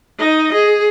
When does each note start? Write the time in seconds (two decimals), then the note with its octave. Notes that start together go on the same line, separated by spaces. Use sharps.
0.19 D#4 D#5
0.54 G#4